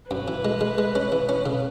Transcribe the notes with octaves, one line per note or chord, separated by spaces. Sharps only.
F#2 B4
E3
G#3
G#3
G#3
C#4
E3
C#4
C#3